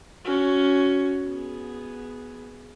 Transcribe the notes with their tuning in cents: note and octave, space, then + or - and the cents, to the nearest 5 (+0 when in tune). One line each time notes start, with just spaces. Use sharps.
C#4 +10 F#4 +0
B3 -5 G#4 +0